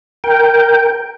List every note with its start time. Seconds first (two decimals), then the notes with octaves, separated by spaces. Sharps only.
0.24 A#4 G5